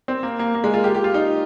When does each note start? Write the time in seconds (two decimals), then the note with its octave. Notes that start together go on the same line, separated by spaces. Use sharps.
0.08 C4
0.23 A#3
0.39 A#3
0.55 A#3
0.64 G#3
0.74 F4
0.84 G4
0.95 G4
1.04 F4
1.14 D#4